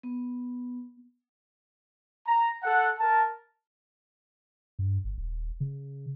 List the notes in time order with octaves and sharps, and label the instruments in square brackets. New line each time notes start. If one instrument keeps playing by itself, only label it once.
[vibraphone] B3
[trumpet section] A#5
A4 F#5
A#4 A5
[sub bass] G2
G1
D#1
C#3